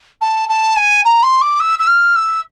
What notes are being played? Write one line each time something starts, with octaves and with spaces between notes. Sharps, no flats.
A5
A5
G#5
A#5
C6
D6
E6
E6
F6
E6